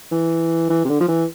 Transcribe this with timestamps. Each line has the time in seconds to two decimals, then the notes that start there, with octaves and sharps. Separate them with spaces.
0.12 E3
0.70 E3
0.85 C3
0.89 D3
1.00 F3
1.08 E3